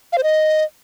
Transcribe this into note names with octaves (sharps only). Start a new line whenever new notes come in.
F5
C5
D#5